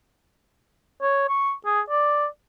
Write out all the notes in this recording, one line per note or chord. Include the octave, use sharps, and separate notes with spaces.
C#5
C#6
G#4
D5